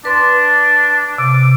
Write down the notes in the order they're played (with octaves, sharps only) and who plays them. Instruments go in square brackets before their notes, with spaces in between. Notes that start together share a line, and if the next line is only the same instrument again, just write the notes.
[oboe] D4 [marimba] B4 C6
[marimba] C3 [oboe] D6